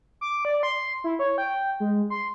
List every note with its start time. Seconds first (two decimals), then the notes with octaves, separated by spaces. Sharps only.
0.21 D6
0.45 D5
0.63 C6
1.04 E4
1.19 C#5
1.38 G5
1.80 G#3
2.10 C6